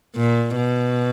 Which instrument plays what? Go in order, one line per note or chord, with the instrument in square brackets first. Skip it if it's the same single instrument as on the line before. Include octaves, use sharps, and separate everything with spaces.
[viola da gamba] A#2
B2